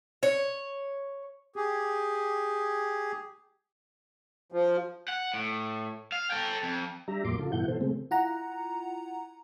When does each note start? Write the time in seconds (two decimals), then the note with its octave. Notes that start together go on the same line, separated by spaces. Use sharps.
0.23 C#5
1.56 G4 G#4
4.52 F3
5.08 F#5
5.34 A2
6.12 F5
6.30 A4 G5
6.63 F2
7.08 G3 D4 G4 E5 A#5
7.25 E2 A2 F3 A#3 C6 D6
7.39 C#3 F4 A4
7.52 G2 B2 E3 E4 F#5 G6
7.68 B2 E3 A4 C5
7.81 C#3 G#3 A3 C4
8.11 E4 F4 F#5 A#5